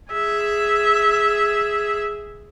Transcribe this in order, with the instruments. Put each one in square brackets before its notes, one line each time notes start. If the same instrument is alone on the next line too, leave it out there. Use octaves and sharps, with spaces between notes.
[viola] G#4 E5